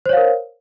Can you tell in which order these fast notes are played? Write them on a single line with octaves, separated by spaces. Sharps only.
C5 C#5 F5 A#4